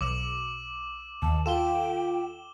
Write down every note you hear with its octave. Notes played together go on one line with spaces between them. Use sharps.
B1 D6 E6 E7
D#2 A5
F4 A4 G5 E7 G7